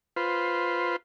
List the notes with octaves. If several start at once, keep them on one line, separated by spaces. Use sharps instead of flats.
F4 B4 C5